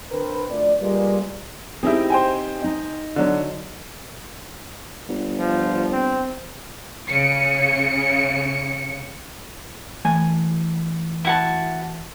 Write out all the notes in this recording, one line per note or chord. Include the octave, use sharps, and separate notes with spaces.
D3 C4 A#4 B4
D2 F3 A3 D5
G3 G#3 A#3 F4 B4 D5
C4 D#4 E4 G4 G#4
C5 G5 G#5
D#4
D3 F#3
G1
F3
C4
C#3 C#7
E3 A3 G#5
E4 F#4 A5